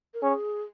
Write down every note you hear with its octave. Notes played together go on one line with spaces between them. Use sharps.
A#4
C#4 G#4